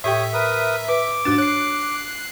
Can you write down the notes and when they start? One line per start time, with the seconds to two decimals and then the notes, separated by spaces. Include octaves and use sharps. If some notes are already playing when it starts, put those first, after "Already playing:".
0.04 A2 G4 C#5 E5 G5 D#6
0.33 A#4 B4 D#6
0.88 B4 D6
1.25 G#2 D4 F#4 A6
1.38 C#5 F#6 C7